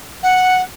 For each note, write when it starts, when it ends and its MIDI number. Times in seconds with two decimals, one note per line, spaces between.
0.23 0.61 78